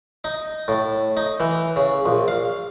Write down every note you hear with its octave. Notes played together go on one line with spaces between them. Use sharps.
D#4
A2
D#4
E3
C#3
A#1
F5